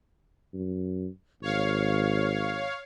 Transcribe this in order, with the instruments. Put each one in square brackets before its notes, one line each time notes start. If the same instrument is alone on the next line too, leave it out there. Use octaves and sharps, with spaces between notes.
[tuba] F#2
[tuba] G#1 [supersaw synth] C#5 F5